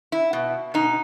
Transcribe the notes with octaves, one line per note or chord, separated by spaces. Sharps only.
E4
B2
B2 D#4